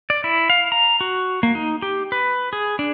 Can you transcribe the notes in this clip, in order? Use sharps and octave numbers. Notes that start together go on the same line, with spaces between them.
D5
E4
F5
A#5
F#4
A#3
D#4
G4
B4
G#4
D4